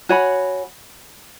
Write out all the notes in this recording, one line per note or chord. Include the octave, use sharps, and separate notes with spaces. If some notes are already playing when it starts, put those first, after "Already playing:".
F#4 C#5 G#5 B5